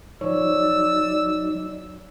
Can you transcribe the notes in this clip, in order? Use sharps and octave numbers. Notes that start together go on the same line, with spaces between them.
F3 F#3 D#4 C#5 D5 E6